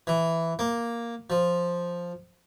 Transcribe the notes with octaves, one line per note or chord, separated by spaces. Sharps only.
E3
A#3
F3